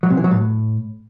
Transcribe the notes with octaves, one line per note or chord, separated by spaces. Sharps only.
F#3
C3
E3
F#3
A2